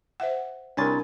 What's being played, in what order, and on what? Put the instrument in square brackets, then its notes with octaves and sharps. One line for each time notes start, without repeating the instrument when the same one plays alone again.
[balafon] C5 E5 F#5
[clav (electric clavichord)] C2 [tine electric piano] D4 G#5 A6 [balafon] A#4 C#5